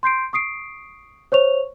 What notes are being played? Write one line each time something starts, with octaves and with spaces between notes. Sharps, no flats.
C6 G6 C7 D7
C#6 D#6 C7 D7
C5 C#5 C#6 F7